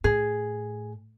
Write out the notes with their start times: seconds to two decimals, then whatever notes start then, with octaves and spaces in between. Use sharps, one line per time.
0.04 A2 G#4